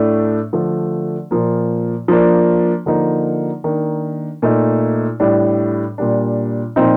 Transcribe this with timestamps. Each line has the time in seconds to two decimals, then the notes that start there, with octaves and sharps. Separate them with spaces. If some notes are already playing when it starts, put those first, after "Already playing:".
Already playing: A2 A3 D4
0.53 D3 F3 A3 D4
1.31 A#2 F3 A#3
2.08 F3 A#3 D4
2.86 D3 F3 A#3 D#4
3.64 D#3 A#3 D4
4.42 A#2 A3 D#4
5.20 A2 G3 D4
5.98 A#2 G3 D4
6.76 A#2 F3 C4 D#4